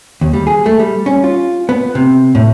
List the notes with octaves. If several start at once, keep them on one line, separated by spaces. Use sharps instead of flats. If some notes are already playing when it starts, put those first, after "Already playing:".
D#2
G3
G#4
A3
G3
C#4
F4
B3
C3
A2